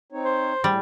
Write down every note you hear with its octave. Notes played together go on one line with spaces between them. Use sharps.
C4 D#4 C#5
C5
A2 G3 G#4